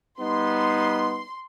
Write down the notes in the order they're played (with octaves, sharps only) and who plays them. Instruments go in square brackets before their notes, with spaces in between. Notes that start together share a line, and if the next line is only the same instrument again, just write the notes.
[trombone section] G3 B3 D#4 [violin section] C6